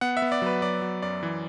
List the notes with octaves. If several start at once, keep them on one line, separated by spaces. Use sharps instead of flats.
B3 F#5
E5
B3
D5
F#3 B4
F#3 D5
F#3
F#2 D5
E3